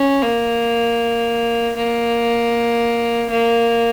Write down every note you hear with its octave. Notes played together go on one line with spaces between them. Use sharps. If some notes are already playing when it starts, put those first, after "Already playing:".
Already playing: C#4
A#3
A#3
A#3